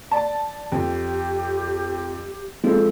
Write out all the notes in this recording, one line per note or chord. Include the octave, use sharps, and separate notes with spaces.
D5 A5
F2 G4
F3 G#3 C4 A4